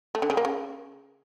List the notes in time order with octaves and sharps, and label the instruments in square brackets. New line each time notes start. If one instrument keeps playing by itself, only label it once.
[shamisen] A3
D3
C#3
A#3
C#3